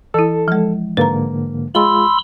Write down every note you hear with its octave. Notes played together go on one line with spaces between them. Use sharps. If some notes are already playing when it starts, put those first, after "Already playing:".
E3 E4 A4
F3 G#3
G#2 D3 A#3 B4 A#5
G#3 F4 B5 C6 E6